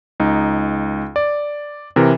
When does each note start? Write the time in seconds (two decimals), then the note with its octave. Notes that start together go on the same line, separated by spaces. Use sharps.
0.20 C#2 D#4
1.16 D5
1.96 C3 E3 A#4